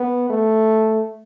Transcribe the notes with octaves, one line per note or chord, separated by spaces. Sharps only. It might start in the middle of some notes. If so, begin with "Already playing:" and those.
Already playing: B3
A3